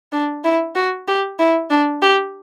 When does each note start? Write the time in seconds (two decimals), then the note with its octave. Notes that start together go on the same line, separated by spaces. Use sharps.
0.12 D4
0.44 E4
0.75 F#4
1.08 G4
1.39 E4
1.70 D4
2.02 G4